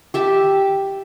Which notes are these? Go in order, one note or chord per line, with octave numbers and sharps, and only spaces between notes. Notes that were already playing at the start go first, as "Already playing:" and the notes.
G4 E5 A5